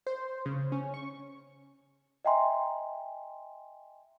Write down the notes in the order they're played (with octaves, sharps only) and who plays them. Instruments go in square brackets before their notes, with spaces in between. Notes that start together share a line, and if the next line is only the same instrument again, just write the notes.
[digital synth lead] C5
C#3
C#4
C#6
[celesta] D#5 E5 G5 G#5 A#5 C6